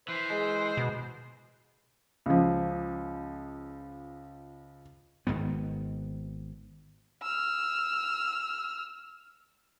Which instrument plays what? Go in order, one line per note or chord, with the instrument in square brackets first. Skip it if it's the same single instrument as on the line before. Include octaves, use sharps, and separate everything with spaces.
[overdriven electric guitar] E3 [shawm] C5
[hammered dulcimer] G#3
[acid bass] B2
[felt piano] C#2 F3
[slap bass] G#1 G#2 D#3 B3
[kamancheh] E6 F6